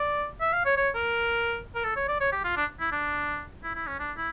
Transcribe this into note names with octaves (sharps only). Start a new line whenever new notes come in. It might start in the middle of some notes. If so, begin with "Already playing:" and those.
Already playing: D5
E5
F5
C#5
C#5
A#4
A#4
A4
C#5
D5
C#5
G4
F4
D4
E4
D4
E4
E4
C#4
D4
E4